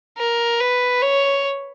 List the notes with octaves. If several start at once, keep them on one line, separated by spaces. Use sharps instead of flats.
A#4
B4
C#5